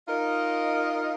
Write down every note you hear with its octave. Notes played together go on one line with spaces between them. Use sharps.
D#4 F4 A#4 D#5